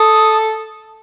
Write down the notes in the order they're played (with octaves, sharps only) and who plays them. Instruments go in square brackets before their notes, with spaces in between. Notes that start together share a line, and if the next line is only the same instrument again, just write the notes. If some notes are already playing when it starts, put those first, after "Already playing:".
Already playing: [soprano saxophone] A4 [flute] D#6